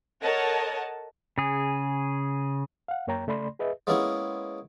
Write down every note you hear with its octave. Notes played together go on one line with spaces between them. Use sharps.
A4 A#4 C#5 D#5 F#5 A5
C#3 G#4
F5 F#5
F#2 A#3 C#5 G5 A#5
C#3 A3 D5 B5 C6
G#4 B4 D#5 E5
G#3 A#3 B3 C#4 E4 G#4